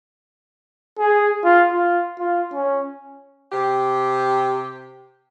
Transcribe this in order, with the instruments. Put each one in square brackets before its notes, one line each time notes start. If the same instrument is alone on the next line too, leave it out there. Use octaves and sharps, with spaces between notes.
[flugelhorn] G#4
F4
F4
F4
C#4
[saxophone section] C3 G4